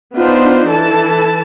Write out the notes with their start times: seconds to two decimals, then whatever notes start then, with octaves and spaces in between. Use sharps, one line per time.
0.16 B3 D4 D#4 F4 C5
0.69 E3 A4 A5